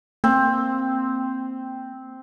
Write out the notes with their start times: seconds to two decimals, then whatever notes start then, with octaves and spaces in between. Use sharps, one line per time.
0.24 A#3 C4